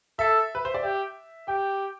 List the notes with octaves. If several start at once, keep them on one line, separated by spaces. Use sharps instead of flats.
A4 E5
B4
C5
D5
G4 E5
G4 G5